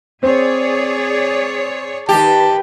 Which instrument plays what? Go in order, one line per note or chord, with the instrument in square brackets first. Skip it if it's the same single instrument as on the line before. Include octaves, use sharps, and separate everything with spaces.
[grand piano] C4 [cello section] G#4 C#5 D5
[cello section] D#3 B4 [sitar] G4 [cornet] A5